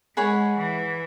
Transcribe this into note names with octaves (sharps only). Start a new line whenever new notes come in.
G#3 G#4 C#5 F#5 B5
E3